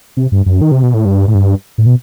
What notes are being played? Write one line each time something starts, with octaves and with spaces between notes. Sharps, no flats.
C3
G2
F#2
D#3
C3
B2
A2
G2
A2
G2
A2
B2